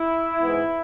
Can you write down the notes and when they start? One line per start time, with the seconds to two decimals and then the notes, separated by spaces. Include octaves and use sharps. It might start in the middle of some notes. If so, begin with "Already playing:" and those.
Already playing: E4
0.42 G#2 E3 B3